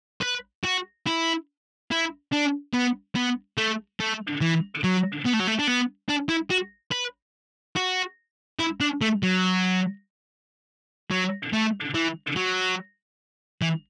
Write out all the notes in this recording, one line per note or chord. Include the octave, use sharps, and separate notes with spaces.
B4
F#4
E4
E4
D4
B3
B3
A3
A3
E3
F#3
B3
A3
F#3
A3
D4
B3
D4
E4
F#4
B4
F#4
E4
D4
A3
F#3
F#3
A3
E3
F#3
E3